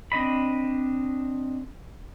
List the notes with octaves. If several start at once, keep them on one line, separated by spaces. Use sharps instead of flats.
C4 D4 D#5 B5